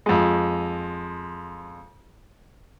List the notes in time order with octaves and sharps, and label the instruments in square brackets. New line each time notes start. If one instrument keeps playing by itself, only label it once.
[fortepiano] F2 G#3